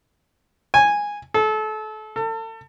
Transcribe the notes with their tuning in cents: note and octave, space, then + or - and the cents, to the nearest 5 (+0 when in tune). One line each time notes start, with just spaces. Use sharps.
G#5 -10
A4 -30
A4 +35